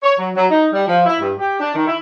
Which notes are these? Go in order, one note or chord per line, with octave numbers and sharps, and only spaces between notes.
C#5
F#3
F#3
D#4
G3
F3
E4
G2
G4
D4
D#3
E4